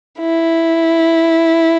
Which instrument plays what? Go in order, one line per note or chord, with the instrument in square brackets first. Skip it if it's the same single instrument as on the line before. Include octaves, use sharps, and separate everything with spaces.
[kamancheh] E4